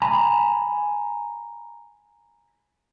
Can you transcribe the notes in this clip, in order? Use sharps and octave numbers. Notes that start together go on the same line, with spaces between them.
G#5 A#5 B5